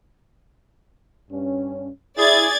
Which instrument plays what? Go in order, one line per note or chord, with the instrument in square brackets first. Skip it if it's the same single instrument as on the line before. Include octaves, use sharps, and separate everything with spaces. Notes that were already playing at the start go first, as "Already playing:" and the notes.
[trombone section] G2 C#4
[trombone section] E4 [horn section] G#4 [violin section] D5 G#6 A6